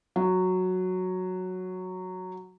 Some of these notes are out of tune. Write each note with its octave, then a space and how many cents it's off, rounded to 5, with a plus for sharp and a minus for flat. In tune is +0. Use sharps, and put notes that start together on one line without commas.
F#3 -5